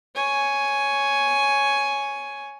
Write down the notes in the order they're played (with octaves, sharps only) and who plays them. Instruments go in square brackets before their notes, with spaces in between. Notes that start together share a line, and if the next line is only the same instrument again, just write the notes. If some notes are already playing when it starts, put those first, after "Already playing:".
[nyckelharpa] C#5 G#5